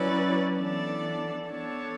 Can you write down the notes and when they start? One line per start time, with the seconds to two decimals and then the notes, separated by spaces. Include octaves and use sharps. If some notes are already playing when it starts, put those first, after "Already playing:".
Already playing: F#3 C#4 E4 B4 D5
0.58 E3 B3 D4 A4 D5
1.50 B3 D4 A4 C#5